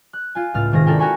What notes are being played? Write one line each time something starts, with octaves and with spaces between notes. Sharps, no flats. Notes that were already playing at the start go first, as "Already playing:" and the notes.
F#6
F4 G#5
C#2 A2 F6 A6
G#1 C3 D#3 G#4 A#6
D4 E4 A4 A#4 G5 G#5
F#4 A#4 G5 G#5 B5 C#6